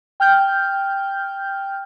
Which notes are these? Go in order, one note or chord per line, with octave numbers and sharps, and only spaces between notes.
G5 F6 G6